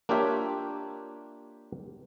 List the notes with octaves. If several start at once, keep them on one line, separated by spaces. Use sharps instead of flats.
A#3 D4 F4 G4 C#5 E5